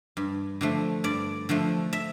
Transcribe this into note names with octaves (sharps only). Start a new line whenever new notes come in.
G2
D3 F3 A3
G2 D5
D3 F3 A3
E5